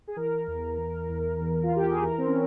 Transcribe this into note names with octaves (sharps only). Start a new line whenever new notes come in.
G#4
E3 A#4
E2
E2
E2
E2
F4
E2 G4
G#4
E3 A#4
C4
C#4